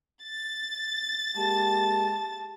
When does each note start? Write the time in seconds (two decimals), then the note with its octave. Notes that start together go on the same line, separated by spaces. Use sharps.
0.22 A6
1.37 G#3 A#3 G4 A5